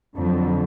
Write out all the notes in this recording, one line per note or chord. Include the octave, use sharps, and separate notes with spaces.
F2 D3 F#3